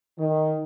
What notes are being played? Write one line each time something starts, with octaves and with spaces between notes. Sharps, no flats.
D#3